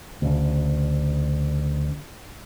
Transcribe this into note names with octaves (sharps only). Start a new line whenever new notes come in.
D2 C#3